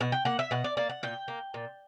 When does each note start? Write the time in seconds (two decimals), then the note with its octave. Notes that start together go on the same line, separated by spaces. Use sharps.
0.01 B2 F#5
0.12 G5
0.25 A#3 F#5
0.39 E5
0.51 B2 F#5
0.64 D5
0.77 A#3 D5
0.89 F#5
1.03 A#2 G5
1.28 A#3
1.54 A#2